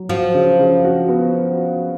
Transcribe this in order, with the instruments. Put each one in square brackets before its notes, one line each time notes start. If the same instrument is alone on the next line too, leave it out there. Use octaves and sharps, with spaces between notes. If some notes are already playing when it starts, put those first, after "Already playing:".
Already playing: [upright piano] F#3
[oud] F3 [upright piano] F#4
[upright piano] C#3
C#3
F#4
B3